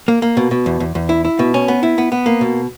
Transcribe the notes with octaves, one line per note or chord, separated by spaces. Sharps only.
A#3
A#3
B2
B2
E2
E2
E2
E4
E4
B2
C#4
B3
E4
B3
B3
A#3
B2